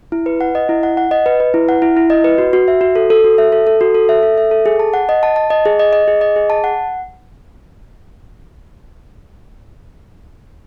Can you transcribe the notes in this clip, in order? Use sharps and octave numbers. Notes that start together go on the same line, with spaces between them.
E4
B4
F#5
D#5
E4
F#5
F#5
D#5
B4
B4
E4
F#5
E4
E4
D#5
B4
F#4
F#4
E5
F#4
A4
A4
F#4
E5
A4
A4
F#4
A4
E5
A4
E5
A4
G#4
A5
F#5
D#5
A5
A5
D#5
G#4
D#5
D#5
G#4
D#5
G#4
A5
F#5